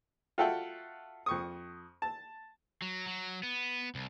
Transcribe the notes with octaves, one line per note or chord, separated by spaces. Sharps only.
F4 F#4 A4 E5 F#5 G5
F2 C#6 D#6
A5
F#3
F#3
B3
C2